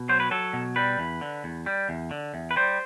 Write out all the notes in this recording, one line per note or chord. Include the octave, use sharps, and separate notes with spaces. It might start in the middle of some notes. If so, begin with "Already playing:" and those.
Already playing: B2
F#3 C5
B4
F#3 A4
B2
G3 B4
E2
D3
E2
G3
E2
D3
E2
B4
G3 C5